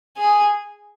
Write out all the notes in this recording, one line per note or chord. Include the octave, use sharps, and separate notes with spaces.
G#4